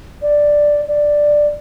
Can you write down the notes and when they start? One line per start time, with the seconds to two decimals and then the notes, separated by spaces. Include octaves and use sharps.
0.22 D5
0.88 D5